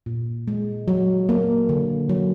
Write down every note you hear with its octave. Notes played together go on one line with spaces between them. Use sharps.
A#2
G#3
F#3
A#3
D3
F#3